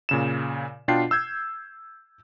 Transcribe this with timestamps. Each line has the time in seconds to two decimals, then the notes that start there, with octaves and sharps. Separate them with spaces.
0.09 A#2 C#3 E7
0.88 B2 D4 F4 G5 C7
1.11 E6 G6 G#6